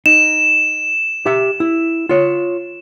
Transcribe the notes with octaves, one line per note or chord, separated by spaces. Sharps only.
D#4 E7
G4 E5
E4
F4 C#5